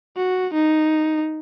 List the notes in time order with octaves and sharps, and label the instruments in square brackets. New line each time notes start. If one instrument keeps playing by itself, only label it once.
[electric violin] F#4
D#4